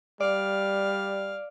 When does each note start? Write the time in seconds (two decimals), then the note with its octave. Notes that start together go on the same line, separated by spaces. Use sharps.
0.21 G3 D5 F5